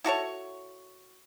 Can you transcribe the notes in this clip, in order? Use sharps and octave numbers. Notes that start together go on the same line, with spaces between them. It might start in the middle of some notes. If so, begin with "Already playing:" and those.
E4 F#4 A4 C#5